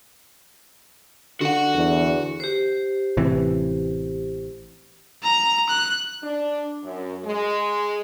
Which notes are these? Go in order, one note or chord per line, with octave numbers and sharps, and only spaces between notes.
D3 F#4 F#5
E2
G4 C5
A1 C3 E3
A#5
F#6
D4
F#2
G#3